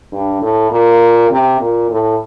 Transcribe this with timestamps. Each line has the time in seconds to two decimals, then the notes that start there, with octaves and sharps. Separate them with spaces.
0.12 G2
0.42 A2
0.71 A#2
1.31 C3
1.60 A#2
1.90 A2